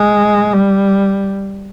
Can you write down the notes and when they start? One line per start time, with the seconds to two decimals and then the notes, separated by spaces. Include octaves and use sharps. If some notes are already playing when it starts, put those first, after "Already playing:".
Already playing: G#3
0.53 G3